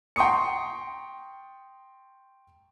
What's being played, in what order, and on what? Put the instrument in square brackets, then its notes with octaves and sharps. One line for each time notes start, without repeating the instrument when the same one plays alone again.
[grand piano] G5 A#5 C6 C#6 D#6 C#7